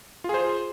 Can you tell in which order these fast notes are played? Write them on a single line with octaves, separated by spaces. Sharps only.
F4 G#4 C5